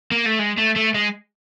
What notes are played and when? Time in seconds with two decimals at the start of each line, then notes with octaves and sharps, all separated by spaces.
0.12 A#3
0.26 A3
0.39 G#3
0.58 A3
0.76 A3
0.94 G#3